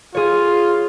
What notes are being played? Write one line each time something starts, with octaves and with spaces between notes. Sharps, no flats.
F4 G#4 C#5